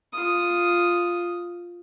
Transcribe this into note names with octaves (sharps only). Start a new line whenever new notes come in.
F4 D#6